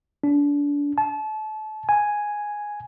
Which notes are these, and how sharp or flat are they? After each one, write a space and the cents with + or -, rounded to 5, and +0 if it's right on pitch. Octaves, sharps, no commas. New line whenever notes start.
D4 -30
A5 -30
G#5 +0